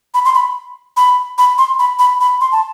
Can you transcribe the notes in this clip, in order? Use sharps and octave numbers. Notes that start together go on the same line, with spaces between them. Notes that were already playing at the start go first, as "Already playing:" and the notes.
B5
C6
B5
B5
B5
C6
B5
B5
B5
C6
A5